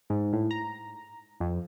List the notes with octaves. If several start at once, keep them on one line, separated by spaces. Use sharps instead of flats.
G#2
A2
A#5
F2